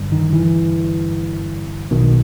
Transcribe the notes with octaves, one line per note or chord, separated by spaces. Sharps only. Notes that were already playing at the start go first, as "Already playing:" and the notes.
Already playing: G1 G2
D#3
E3
B1 B2 D#3